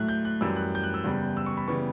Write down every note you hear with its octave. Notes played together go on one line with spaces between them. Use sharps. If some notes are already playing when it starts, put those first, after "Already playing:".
Already playing: A2 F#3 A3 F#6
G6
F#6
F#2 E3 G3 E6
F#6
G6
F#6
E6
E2 C#3 G3
E6
C#6
B5
C#3 E3 G3 B3 C#6